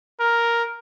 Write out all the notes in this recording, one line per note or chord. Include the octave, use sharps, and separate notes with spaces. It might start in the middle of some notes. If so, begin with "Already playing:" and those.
A#4